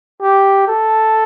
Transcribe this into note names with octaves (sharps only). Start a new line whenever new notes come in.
G4
A4